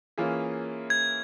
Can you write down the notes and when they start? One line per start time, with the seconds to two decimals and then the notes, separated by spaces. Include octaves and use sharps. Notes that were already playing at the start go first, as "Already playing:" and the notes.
0.18 E3 A#3 C#4 F4 G#4
0.90 G#6